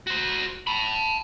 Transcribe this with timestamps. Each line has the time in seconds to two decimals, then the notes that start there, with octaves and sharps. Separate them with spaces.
0.07 F#4 C5
0.67 A5 B5